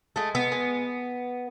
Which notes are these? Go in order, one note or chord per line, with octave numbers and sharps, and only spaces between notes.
G#3 A3
B3
G#3